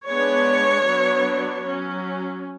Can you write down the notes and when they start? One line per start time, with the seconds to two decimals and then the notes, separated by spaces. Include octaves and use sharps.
0.09 G#3 B3 D4 C#5
0.87 F#3 B3 D4
1.64 F#3 C#4